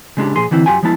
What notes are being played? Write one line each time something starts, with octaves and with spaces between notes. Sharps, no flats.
C#3 G#3 D4 G4
A#2 F3 G#4 C6
D3 E3 C4 E4
F#2 F4 G4 G5 G#5
F3 G#3 B3 E4 A5